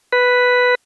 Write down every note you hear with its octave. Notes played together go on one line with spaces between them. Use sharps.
B4